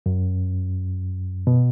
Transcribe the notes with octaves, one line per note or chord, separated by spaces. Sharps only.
F#2
B2